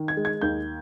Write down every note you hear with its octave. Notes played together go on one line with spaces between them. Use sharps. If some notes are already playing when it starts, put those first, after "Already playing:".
Already playing: D#3
G#6
G#3
G#6
D#2 G6